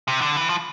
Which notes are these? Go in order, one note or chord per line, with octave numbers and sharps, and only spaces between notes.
C3
D3
E3
F3